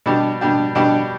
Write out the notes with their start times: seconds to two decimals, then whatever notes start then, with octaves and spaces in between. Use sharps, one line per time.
0.06 B2 G3 D4 G4
0.41 B2 G3 D4 G4
0.75 B2 G3 D4 G4